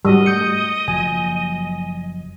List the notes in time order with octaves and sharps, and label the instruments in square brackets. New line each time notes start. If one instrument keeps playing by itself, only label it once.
[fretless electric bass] G#2 [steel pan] G3 F#4 [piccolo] D#5
[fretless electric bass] A3 [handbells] D#6 G6 C#7
[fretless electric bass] F#1 F3 F#3 [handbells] G#5